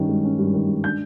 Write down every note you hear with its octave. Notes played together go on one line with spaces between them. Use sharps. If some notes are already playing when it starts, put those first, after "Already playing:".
Already playing: G2 D#3 C#4
G#3
C#4
G2
D#3
G#3
D4 G6